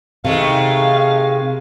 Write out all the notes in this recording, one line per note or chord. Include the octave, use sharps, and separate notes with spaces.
C3 D#3 G#3 A3 F5